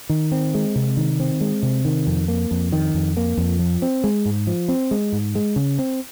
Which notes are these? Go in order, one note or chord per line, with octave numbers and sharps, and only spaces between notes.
D#3
C4
G#3
C3
D#3
C4
G#3
C3
D#3
F2
A#3
F2
D#3
F2
A#3
F2
F3
C4
G#3
G#2
F3
C4
G#3
G#2
G#3
C#3
C4